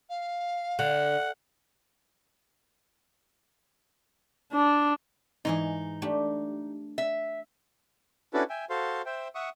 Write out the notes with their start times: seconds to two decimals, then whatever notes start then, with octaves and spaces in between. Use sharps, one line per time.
0.09 F5
0.79 D3 F#5
4.52 D4
5.45 G#2 E3 D#4 G#4
6.02 A3 D4 G4
6.98 E5
8.34 C#4 D4 E4 F#4 A4 B4
8.50 E5 G5 G#5
8.70 F#4 A4 C5 F5 C6
9.06 C5 E5 G5
9.35 E5 F#5 C#6 D#6